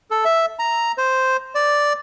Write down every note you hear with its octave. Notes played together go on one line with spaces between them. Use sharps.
A4
E5
A#5
C5
D5